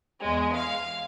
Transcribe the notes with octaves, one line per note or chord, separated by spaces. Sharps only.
E2 G#3
F5